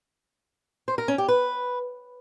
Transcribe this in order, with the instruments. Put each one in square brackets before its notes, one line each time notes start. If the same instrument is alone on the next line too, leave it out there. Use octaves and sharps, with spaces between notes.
[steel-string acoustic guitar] C5
A#4
C#4
G4
B4